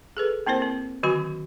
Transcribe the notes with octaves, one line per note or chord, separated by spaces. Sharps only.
G#4 A4 B4
A#3 C4 E4 A#4 C5
C4
D3 D#3 F#3 F#4 G#5 B5